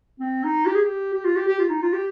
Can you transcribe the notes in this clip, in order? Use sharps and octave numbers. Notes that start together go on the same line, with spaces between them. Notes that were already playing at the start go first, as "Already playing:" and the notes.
C4
D#4
G4
G#4
G4
G4
F4
G4
G4
F4
D#4
F4
G4